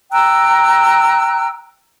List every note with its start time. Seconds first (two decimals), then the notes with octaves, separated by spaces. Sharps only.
0.12 G5 A#5 E6 F#6